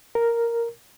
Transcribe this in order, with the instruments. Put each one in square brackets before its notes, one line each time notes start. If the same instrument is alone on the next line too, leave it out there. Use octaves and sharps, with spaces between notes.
[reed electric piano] A#4